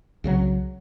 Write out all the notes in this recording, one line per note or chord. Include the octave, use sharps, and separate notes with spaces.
C2 C#3 F#3